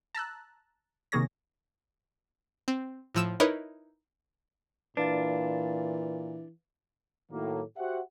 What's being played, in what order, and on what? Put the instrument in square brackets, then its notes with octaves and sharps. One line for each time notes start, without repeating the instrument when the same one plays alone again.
[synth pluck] A5 A#5 E6 F#6
C3 D#3 A#3 G#4 C#5 A#6
C4
A2 F3 E6 E7
D#4 E4 A#4 B4 C#5 D#5
[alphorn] A#2 [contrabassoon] E3 [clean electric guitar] D4 [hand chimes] B4 F5 A6
[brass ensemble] A2 D#3 F#3 A#3
F#4 G4 C5 E5 F#5